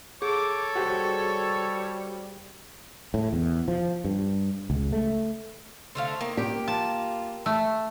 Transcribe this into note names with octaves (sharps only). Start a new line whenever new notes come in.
G#4 A4 C#5 D6
G3 F#4 G4 C5
A2
E2
F3
G2
C#2
A3
D3 A3 C5 F5
D#3 A#3
G4
F4 A5
A3